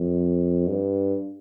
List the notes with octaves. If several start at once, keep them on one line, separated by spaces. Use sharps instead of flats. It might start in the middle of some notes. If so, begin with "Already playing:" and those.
Already playing: F2
G2